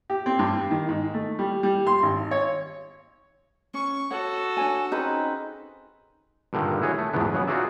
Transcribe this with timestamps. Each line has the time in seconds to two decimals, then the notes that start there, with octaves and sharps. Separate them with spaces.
0.10 G4
0.26 C4
0.39 G2
0.71 D#3
0.89 G#2
1.14 A3
1.39 G3
1.63 G3
1.87 C6
2.03 G#1
2.31 C#5
3.74 C#4 C#6
4.11 F#4 A4 C#5 F#5
4.57 D4 C#5 G#5
4.92 C4 C#4 D#4 G#4 B4 D#5
6.53 G2 A#2 D3 D#3
6.81 E4 F#4 G#4 C#5
6.98 A3
7.13 A#1 E2 G#2 B3 D4
7.32 C#3 F#3 B3
7.47 D#4 F4 F#4 G#4 D5 E5